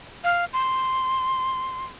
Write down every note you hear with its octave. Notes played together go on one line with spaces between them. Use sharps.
F5
C6